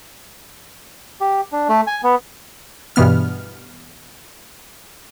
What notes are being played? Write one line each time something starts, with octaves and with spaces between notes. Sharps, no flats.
G4
D4
A3
G#5
B3
G2 B2 E3 B3 F6